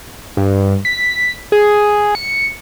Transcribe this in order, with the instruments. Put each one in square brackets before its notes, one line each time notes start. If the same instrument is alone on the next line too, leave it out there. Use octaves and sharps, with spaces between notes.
[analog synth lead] G2
B6
G#4
C#7